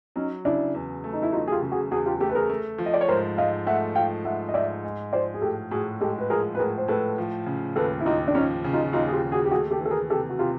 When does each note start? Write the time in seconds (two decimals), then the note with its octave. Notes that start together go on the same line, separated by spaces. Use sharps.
0.16 F#3 C#4 D#4
0.45 C#3 D4 E4
0.74 E2
1.04 A3
1.13 D#4
1.23 E4
1.32 F#3 D#4 F4
1.48 G#4
1.52 F4 G4
1.62 C#3
1.71 F#4 G#4
1.91 E2 F#4 G#4
2.06 F4 G4
2.20 A3 G4 A4
2.30 B4
2.35 G#4 A#4
2.50 A3
2.78 F3
2.86 D#5
2.94 D5
3.01 C#5
3.08 G#2 A#4 C5
3.38 G#2 D#5 F5
3.67 A3 E5 F#5
3.96 F3 F5 G5
4.25 G#2 E5 F#5
4.49 D#5
4.54 G#2 D5 E5
4.84 G#3
5.13 F3 C5 D5
5.34 G#4
5.42 A2 G4 A4
5.71 A2 F#4 G#4
6.01 G#3 G4 A4
6.19 B4
6.30 F3 G#4 A#4
6.55 B4
6.59 A2 G#4 A#4
6.78 C5
6.88 A2 A4 B4
7.18 F3
7.46 C#3
7.76 D#2 A4 B4
8.00 E4
8.05 D#2 D#4 F4
8.28 D4
8.35 F3 C#4 D#4
8.64 C#3
8.73 D#4 F4
8.93 D#2 D#4 F4
9.07 G#4
9.12 F4 G4
9.23 D#2
9.32 F#4 G#4
9.45 G4
9.51 A3 F#4 G#4
9.71 G4 A4
9.80 E3
9.86 A4
9.91 G#4 A#4
10.10 C3 G4 A4
10.29 F#4
10.39 C3 F4 G4